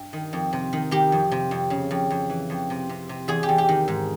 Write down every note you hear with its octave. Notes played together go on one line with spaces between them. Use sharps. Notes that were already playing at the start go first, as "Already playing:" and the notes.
Already playing: G2
D#3
F2
C3
D#3
D#3 G4
F2
C3
F2
C#3
F2
F2
E3
F2
C3
C3
C3
E2 G#4
G4
E2
G4
D#3
G#2